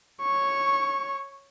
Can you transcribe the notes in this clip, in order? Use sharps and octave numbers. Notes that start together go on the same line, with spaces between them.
C#5 C#6